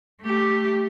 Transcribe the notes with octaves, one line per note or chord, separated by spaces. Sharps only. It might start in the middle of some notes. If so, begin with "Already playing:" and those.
A3 G4